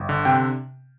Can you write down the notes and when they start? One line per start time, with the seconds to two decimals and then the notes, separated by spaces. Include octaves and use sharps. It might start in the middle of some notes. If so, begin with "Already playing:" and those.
Already playing: G1
0.09 D3
0.25 C3 G5